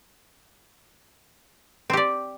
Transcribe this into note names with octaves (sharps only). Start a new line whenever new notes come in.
C4 G4 D5